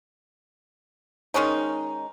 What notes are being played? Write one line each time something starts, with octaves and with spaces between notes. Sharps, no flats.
D#3 G#3 C#4 D#4